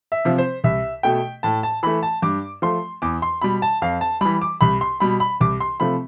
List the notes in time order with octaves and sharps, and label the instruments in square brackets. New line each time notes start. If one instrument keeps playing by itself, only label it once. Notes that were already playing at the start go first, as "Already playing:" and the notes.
[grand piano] E5
C3 F3
C5
C2 E5
B2 A3 G5
A2 A5
A5
E3 A3 B5
A5
G2 D6
F3 A3 C6
E2 D6
C6
B2 G3 B5
A5
F2 F5
A5
E3 G3 B5
D6
C2 B5
C6
B2 G3 B5
B5
C2 D6
C6
C3 F3 A3 B5